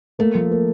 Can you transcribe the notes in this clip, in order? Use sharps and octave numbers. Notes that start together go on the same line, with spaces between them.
A3 A#3
F3
A#3